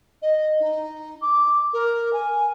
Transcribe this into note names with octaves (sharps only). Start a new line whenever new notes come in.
D#5
D#4
D6
A#4
G#5